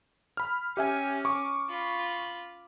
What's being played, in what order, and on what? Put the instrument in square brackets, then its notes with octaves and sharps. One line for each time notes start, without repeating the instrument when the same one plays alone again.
[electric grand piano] B5 F6
[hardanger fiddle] C#4 [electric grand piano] G4 E5 G#5
[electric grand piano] C#6 D6
[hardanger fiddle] F4 B5